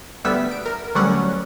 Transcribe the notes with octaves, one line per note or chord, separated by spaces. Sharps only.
D2 G3 B3 E5 B6
D7
A#4
D2 D3 F#3 G3 C#4 F#5